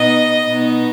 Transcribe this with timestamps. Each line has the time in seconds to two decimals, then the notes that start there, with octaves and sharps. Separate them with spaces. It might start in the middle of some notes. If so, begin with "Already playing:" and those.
Already playing: B2 B3 D#4 D#5
0.47 B2 B3 D#4